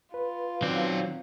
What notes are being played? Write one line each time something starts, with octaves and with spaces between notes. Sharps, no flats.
F4 B4
D#3 F#3 C4 D5